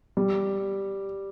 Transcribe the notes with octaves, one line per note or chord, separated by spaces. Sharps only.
G3